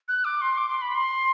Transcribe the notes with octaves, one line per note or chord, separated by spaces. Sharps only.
F#6
D6
C6
D6
C6
B5
C6